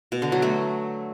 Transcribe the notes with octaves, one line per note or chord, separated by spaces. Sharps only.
B2
D3
F#3
A3